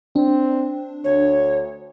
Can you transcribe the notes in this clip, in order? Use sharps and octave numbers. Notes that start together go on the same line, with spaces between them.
C4 D4
D2 C#5